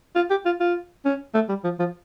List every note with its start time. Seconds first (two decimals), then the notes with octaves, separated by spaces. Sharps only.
0.15 F4
0.30 G4
0.46 F4
0.60 F4
1.05 C#4
1.34 A3
1.49 G3
1.64 F3
1.79 F3